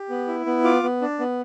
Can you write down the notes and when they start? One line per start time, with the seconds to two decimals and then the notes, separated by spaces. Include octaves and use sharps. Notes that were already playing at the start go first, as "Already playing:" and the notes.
Already playing: G4
0.09 B3
0.28 E4
0.46 B3
0.64 F4 D6
0.83 B3
1.02 D4
1.19 B3